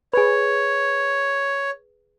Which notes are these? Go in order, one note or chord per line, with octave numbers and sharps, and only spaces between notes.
G#4 B4 C#5